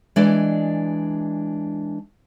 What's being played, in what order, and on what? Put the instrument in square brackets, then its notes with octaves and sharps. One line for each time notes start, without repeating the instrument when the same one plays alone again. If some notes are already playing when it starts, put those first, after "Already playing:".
[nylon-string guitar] E3 G#3 D4 D5 D#5